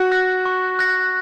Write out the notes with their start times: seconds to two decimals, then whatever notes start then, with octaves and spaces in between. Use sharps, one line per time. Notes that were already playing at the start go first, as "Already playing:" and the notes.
Already playing: F#4
0.12 F#6 A#6
0.45 C#6
0.79 F#6 A#6